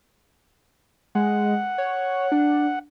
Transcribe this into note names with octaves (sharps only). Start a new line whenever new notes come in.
G#3 F#5
C#5
D4